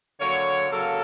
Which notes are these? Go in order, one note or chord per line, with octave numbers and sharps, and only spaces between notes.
D3 F#3 A#3 C#5
C#3 F#3 A#3 A4